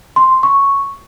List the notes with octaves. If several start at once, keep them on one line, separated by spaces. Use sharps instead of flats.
C6
C#6